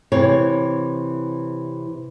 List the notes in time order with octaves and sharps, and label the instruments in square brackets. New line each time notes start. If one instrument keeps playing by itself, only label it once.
[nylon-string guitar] C3 E3 C#5